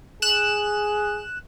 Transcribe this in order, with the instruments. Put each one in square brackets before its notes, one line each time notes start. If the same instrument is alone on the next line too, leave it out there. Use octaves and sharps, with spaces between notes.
[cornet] G#4 [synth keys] F#6 E7